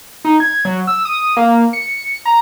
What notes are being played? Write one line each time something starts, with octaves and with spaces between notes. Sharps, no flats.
D#4
G#6
F#3
E6
D#6
A#3
C#7
A#5